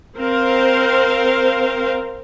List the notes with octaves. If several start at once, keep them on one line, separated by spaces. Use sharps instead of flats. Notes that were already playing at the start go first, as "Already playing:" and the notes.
C4 A#4 C5 F5